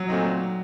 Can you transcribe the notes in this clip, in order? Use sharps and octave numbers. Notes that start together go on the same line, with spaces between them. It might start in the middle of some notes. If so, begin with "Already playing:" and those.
Already playing: F#3
A#2 A3 C4 D#4